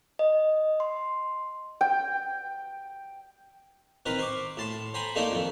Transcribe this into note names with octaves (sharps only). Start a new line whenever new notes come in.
D#5
C6
G5
D#3 C4 A#4 B4
C5 C#6 D6
A2 A5 C6
C5 G5 G#5 A#5 B5
A3 A#3 D#4 A4 D5 D#5
F2 D#3